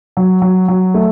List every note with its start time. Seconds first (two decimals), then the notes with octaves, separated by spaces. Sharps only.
0.17 F#3
0.42 F#3
0.68 F#3
0.94 A3